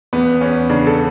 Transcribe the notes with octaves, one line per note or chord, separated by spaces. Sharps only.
E2 B3
E2 C#4
C#3 D4
A4